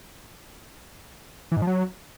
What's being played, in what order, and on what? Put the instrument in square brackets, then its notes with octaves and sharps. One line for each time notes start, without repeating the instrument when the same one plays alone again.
[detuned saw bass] E3
G#2
F3
F#3